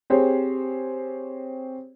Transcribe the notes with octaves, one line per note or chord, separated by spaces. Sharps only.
C4 G4 G#4 C5 C#5